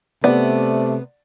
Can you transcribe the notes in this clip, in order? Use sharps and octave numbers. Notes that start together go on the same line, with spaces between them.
C3 A3 B3 D5